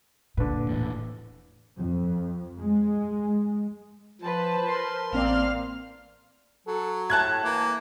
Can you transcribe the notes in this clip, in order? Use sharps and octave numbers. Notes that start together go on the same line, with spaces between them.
A#2 D3 B4
E1 A2 E3
F2
G#3
F3 B4 C5 A5
A#4 C6
A1 A#3 C4 D5 F5 F6
F#3 A4
A2 A5 F#6 G#6
E3 A#3